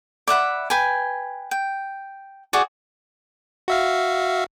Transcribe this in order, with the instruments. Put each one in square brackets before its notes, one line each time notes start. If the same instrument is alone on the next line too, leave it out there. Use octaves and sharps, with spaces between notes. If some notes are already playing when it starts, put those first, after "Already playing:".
[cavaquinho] D5 E5 F#5 B5
B4 G5 G#5
G5
F#4 G#4 D5
[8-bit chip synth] F#4 E5 F5